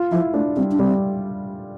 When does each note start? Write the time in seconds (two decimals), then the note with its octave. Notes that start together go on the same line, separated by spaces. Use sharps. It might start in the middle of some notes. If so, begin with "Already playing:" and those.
Already playing: F4
0.11 F3 E4
0.34 A3 D4
0.56 G3 C4
0.72 D4
0.79 G3 C4